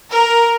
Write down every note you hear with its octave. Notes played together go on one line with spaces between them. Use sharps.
A#4